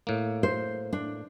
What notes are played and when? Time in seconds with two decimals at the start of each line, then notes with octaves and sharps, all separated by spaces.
0.07 A2 A#3
0.43 C5
0.93 D4